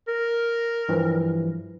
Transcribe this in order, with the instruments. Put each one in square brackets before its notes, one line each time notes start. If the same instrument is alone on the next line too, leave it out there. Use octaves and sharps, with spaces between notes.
[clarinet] A#4
[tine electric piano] G2 E3 F3